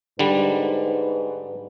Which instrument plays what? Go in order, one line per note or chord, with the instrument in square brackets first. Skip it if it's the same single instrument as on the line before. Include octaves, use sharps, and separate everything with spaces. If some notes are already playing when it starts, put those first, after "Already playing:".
[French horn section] G#2 B4 [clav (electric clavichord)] D3 G3